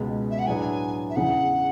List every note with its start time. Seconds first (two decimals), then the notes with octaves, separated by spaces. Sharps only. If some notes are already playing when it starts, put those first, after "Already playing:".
Already playing: C#2 B2 G#3 B3
0.31 E5
0.39 F#5
0.46 A2 F#3 B3 D4 G#4 G#5
1.09 E5
1.16 E2 C#3 E3 F#5